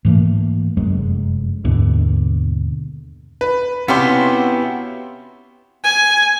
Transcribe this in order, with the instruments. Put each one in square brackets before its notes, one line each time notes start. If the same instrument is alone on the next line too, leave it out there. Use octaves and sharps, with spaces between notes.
[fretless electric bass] G#2 E3 A3 A#3
F1 F#2 F#3 G#3
D#2 G#2 B2 D3
[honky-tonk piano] B4
[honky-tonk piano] C3 C#4 C6 [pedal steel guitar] B3 E4 F5 [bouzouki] F#4 G4
[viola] G#5